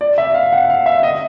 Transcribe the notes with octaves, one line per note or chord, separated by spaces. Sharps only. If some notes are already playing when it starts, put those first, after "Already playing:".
D5
E5
F5
F#5
F5
E5
D#5